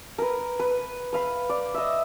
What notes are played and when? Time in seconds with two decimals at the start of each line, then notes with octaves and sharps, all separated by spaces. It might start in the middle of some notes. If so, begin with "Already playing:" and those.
0.18 A#4 B4
0.59 B4
1.13 B4 F5 B5
1.49 D5
1.74 D#5 E5